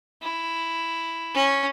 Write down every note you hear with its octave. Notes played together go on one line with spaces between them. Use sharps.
E4
C#4